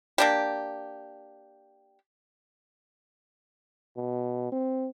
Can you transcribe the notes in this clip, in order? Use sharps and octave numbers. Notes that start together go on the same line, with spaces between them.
A#3 D4 G4
B2
C4